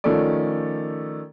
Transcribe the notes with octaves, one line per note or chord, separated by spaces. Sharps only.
D#3 F3 A3 C#4 A4 D5